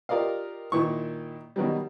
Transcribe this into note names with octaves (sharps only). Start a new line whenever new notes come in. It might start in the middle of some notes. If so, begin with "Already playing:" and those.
F4 G4 A#4 D5 D#5 F5
A#2 D#3 E4 C#6
B2 D#3 F#3 G3